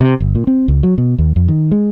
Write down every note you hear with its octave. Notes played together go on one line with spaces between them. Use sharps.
C3
G1
A#2
C4
C#2
F#3
B2
D#2
F2
D#3
G#3